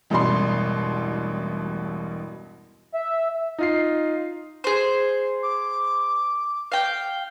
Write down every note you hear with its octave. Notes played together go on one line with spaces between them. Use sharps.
E1 A1 G2 B2 D5 C6
E5
D#4 F4 C7
G#4 C5
D6
F5 G5